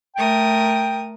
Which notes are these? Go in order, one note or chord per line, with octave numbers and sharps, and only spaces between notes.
A3 A#4 G5 D#6